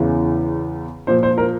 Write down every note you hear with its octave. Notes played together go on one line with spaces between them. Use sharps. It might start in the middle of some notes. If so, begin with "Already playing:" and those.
Already playing: E2 C#3 E3
A#2 F3 C5
C5
A#4